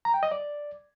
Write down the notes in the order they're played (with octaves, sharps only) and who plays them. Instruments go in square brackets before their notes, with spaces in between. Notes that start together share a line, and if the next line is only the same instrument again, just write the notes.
[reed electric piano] A#5
G5
D#5
D5